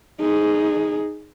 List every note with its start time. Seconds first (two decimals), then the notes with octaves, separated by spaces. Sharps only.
0.20 D#4 G#4